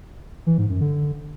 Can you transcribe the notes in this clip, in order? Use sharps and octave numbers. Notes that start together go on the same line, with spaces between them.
E3
G#2
F#2
D3